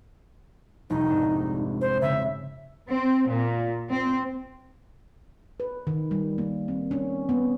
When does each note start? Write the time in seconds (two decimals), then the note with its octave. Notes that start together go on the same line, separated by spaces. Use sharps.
0.90 F1 C2 D#4
1.10 G#2 D4
1.81 C5
2.02 C#3 E5
2.89 C4
3.27 A#2
3.91 C4
5.60 B4
5.87 D#3
6.11 G3
6.38 A#3
6.68 C4
6.91 C#4
7.29 B3